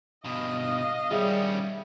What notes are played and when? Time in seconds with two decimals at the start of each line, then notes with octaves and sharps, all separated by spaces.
0.24 G2 B2 D#5 F5
1.11 D#3 G3 C#4 G#4 E5